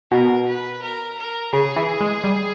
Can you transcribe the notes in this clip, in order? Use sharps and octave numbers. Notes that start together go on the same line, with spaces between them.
B2 A#4
B4
A#4
A#4
C#3 G#4
E3
G#3
G3